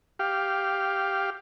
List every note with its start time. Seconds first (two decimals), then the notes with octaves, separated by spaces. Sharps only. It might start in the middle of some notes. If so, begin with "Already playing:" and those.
0.19 G4 F5